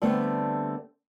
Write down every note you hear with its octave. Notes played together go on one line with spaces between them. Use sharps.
D3 G3 A3 B3 C4